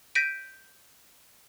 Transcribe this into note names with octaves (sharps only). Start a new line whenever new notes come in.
G6 A#6 B6 D7 D#7